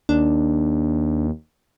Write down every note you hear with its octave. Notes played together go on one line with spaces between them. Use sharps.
D#2 D4